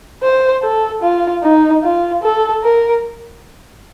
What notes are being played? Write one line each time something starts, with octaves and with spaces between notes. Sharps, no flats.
C5
A4
F4
D#4
F4
A4
A#4